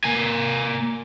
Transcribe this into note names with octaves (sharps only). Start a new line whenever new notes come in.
A#3 G#5